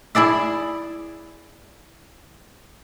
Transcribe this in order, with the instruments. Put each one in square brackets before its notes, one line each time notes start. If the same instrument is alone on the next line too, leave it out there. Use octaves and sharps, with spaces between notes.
[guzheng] E4 G#4 D5 E5